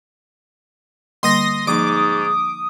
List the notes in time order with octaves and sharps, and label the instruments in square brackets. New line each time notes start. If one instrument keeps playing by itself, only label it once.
[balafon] D3 G3 A#3 [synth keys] C6 D#6 A#6
[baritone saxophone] G#2 [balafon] F3 A#3 D#4 [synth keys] D6 [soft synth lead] D#6